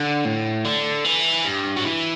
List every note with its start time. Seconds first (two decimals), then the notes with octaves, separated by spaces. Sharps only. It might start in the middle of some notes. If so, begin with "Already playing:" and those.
Already playing: D3
0.25 A2
0.65 D3
1.05 E3
1.45 G2
1.76 F#3
1.85 E3